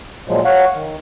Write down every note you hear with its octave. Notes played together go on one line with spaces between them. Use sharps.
A#2 F3 F#3 G#3
C#5 F5 F#5
D#3